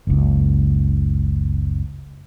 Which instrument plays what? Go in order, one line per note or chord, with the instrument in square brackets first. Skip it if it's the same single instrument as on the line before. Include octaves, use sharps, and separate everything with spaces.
[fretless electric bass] F#1 C#2